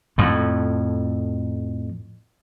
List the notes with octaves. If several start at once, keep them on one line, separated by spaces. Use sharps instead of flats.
F2 A2